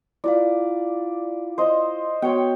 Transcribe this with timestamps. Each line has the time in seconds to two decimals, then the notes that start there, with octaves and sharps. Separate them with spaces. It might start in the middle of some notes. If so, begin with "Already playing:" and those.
0.24 E4 F4 D5 F5
1.58 C5 D#5
2.22 B3 F#4 C#5 G5 C#7